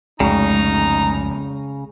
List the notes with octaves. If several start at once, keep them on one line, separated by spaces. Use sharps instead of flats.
C2 F2 C#3 G#3 A3 D#4 A#5